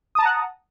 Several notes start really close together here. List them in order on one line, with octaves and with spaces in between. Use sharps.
D#6 A5 A#5 F#5